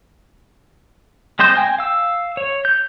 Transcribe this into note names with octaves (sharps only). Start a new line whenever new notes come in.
G#3 C4 C5 D#5 G6
G5 G#5
F5 E6
C#5
G6